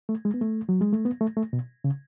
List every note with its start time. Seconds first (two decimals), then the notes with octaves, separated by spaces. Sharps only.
0.09 A3
0.25 G#3
0.34 B3
0.41 A3
0.69 F#3
0.81 G#3
0.93 A3
1.05 B3
1.21 A3
1.37 A3
1.53 B2
1.84 C#3